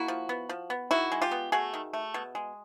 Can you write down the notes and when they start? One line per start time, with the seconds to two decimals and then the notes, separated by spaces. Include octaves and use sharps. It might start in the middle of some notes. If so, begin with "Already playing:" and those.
Already playing: A#3 E4 F#4
0.08 F3
0.29 B3
0.49 F3
0.70 B3
0.91 D#3 E4 F#4
1.12 G#3
1.22 F4 G4
1.31 B3
1.52 A3 F#4 G#4
1.73 D#3
1.93 A3
2.14 B2
2.35 G#3